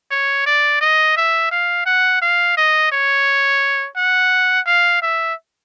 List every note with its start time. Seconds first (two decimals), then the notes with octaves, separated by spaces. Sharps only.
0.11 C#5
0.46 D5
0.81 D#5
1.17 E5
1.51 F5
1.86 F#5
2.22 F5
2.57 D#5
2.92 C#5
3.97 F#5
4.67 F5
5.02 E5